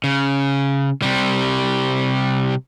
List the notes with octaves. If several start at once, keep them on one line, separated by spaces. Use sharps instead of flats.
C#3
C3 G3